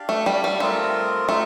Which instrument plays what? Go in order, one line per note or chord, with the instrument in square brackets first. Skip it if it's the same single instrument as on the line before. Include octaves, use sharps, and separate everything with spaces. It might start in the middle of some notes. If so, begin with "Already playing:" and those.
Already playing: [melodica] D4 G4 D5 F5
[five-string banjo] A3
G3
G3
[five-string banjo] A3 [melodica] C4 F4 A#4 D#5
[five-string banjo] A3 [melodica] F4 D#5